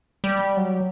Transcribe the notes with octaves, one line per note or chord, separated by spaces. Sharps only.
G3
F#3